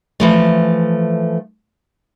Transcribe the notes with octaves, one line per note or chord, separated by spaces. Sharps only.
E3 F3 A3